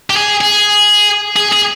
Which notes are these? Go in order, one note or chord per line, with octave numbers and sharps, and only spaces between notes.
G4
G#4
G#4
G#4
G#4